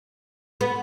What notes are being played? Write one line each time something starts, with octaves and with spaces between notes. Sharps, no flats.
B3